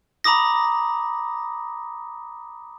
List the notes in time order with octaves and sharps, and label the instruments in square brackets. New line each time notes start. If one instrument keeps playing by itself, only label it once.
[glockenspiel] A#5 B5 D6 D#6 A#6